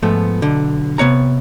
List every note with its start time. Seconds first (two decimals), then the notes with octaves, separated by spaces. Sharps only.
0.03 G#2 F3 A3 B3
0.42 B1 D3
0.98 C3 B3 C#5 A#5